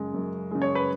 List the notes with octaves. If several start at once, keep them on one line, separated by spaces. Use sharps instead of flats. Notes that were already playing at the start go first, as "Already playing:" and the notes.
Already playing: F#2 C#3 G#3
F#2
C#3 G#3
C#5
B4